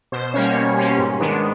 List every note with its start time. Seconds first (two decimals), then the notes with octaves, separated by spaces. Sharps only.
0.12 B2 C5
0.34 G3 A#3 C#4 C#5
0.56 B2
0.77 G3 A#3 C#4
0.98 G#2
1.20 D#3 G#3 B3 D4